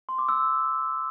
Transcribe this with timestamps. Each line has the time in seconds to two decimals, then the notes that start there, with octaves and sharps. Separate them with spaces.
0.09 C6
0.19 D6
0.29 E6